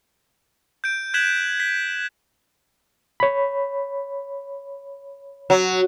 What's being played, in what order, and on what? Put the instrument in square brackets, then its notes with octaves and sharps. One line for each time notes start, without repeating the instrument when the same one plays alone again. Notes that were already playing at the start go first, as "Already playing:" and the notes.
[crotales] G6 D7
F#6 G#6 B6 E7 F#7
B6
[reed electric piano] C#5 B5
[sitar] F#3